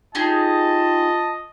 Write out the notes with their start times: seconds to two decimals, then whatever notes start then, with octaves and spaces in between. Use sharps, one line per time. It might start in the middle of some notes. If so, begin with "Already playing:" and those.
0.15 D#4 F4 G4 G#4 D#5 A5